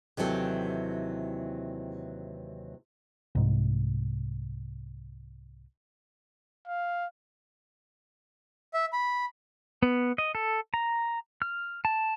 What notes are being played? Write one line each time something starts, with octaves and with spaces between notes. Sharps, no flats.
D#2 C3 E3 F#3 A4
C2 G#2
F5
E5
B5
B3
D#5
A4
A#5
F6
A5